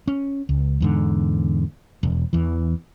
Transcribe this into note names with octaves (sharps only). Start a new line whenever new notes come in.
C#4
C#2
E2 G#2 D3
E1
E2 E3